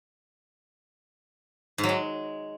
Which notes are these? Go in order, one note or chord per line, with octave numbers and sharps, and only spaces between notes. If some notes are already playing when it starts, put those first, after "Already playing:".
G#2
F#3
G#3